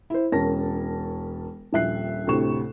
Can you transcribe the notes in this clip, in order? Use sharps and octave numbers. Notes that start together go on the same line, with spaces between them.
E4 C5
E1 C#4 A#4 A5 A#6
D#1 A#1 E5 F#6 C7
D2 A2 C3 C#6 E7